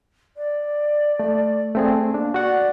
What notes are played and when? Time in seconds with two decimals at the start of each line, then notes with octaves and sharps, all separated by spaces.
0.37 D5
1.19 A3
1.75 A3 C4 G#4
2.14 A#3 D4
2.34 F#4 D5 F#5 C#6